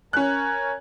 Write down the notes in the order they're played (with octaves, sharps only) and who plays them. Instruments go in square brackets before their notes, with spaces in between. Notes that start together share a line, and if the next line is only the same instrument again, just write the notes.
[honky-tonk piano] C#4 F#6 [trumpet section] A#4 G#5